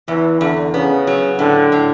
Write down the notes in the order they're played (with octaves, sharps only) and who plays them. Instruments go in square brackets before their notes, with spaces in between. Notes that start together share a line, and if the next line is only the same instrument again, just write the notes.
[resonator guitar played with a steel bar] E2 [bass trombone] E3
[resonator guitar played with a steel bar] E2 [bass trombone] D3
[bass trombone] C#3 [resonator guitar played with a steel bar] B3
[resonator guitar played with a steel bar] F#3
[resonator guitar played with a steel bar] A2 [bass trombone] D3
[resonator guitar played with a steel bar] A2